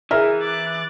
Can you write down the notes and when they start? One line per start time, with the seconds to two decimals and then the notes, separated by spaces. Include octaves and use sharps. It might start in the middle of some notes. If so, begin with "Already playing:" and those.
0.11 E3 G#4 A#4 E5
0.41 D6 F#6 A6